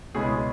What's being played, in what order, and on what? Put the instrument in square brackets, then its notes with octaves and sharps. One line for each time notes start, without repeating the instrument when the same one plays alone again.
[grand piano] C#2 B2 G#3 C#4 E4 G#4